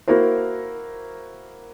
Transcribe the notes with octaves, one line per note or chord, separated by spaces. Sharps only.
A#3 E4 F#4 A#4 C5